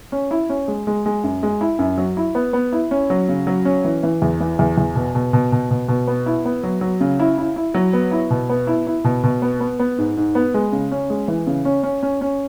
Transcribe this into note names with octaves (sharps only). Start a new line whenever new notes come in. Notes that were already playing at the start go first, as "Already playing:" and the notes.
C#4
E4
C#4
G#3
G#3
G#3
F#2
G#3
E4
F#2
F#3
E4
B3
B3
E4
C#4
F#3
C#3
F#3
C#4
E3
E3
E2
E3
E2
E2
B2
B2
B2
B2
B2
B2
B3
E4
B3
F#3
F#3
C#3
E4
E4
E4
F#3
B3
E4
B2
B3
E4
E4
B2
B2
B3
B3
B3
G#2
G#2
B3
G#3
C#3
C#4
G#3
E3
C#3
C#4
C#4
C#4
C#4